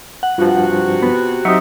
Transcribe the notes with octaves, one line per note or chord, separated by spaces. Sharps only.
F#5
G2 C3 F3 F4 F#4
B3
F#3 C4 D#4 G4 E5 D#6 C#7